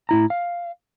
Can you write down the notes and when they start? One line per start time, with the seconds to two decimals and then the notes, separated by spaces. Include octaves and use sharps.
0.09 A2 E4 A#5
0.30 F5